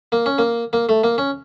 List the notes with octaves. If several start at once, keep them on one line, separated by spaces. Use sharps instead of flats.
A#3
C#4
A#3
A#3
A3
A#3
C#4